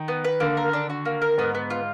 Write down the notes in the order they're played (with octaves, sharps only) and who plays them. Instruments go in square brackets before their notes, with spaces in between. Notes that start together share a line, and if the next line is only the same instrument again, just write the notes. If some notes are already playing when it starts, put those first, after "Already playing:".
Already playing: [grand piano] D#3
[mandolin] B3
B4
[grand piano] D3 [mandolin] A#3
[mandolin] A#4
D4
F#4
A#3
A#4
[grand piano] G#2 [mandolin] B3
[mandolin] B3
F4